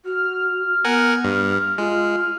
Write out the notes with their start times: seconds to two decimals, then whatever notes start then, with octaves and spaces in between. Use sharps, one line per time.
0.05 F#4 F6
0.85 B3 A#4 F#5 G#5
1.25 G2
1.78 G#3 F4